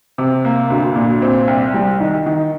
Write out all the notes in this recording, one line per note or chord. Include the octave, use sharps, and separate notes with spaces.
C3
A#3
D2
A#2
C4
C2
G3
D#3
D#3